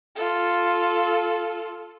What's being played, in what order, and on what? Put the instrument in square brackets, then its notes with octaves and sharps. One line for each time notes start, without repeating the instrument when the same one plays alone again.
[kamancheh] F4 A4